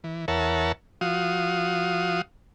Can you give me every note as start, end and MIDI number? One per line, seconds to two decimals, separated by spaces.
0.04 0.26 52
0.28 0.72 40
0.28 0.72 70
0.28 0.72 73
0.28 0.72 76
0.28 0.72 78
0.28 0.72 81
1.01 2.22 53
1.01 2.22 66
1.01 2.22 77
1.01 2.22 87